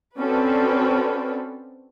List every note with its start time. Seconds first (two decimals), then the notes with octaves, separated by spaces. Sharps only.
0.19 C4 C#4 F#4 A4 B4 D5